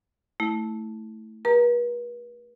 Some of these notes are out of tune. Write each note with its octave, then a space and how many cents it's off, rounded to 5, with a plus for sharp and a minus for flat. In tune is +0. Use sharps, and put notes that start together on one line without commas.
A3 +0 E4 -15
G4 +35 B4 -40 A#5 +0